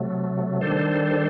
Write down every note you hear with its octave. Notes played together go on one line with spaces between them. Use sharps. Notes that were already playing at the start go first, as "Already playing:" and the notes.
Already playing: C3 F#3 A3
D#3 G3 D4 A4 C5